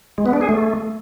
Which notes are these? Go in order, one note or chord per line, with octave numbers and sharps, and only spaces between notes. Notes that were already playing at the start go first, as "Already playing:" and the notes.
G#3
B3
D4
G#4
A3